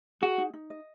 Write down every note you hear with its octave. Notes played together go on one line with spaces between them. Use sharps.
F#4 G#4
D#4
D#4
D#5